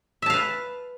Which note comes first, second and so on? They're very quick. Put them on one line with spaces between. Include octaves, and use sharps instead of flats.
E5 A5 F5 B4